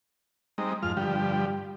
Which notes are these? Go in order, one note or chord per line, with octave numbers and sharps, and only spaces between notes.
G3 G#3 C4 D#4 A#5
F2 G#2 F4 F6
G2 D3 F3 G3 G4